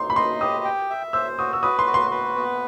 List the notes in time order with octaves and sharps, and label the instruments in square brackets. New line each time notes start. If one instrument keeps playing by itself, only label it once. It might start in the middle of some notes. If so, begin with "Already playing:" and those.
Already playing: [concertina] D#4 [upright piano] C6
[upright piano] B5
[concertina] D#5 [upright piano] C6
[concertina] G4 [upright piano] D#6
[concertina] G5
E5
[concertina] C5 [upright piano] E6
[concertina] F#4 [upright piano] D#6
[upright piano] E6
[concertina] B4 [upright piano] D#6
[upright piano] C6
[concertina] F#4
[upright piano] C6
[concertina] B4
B3